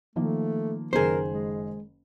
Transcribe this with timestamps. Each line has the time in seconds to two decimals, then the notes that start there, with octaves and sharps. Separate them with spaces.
0.16 D#3 F3 A3 A#3
0.93 F#1 D#3 G#4 A#4 C5
1.30 G#3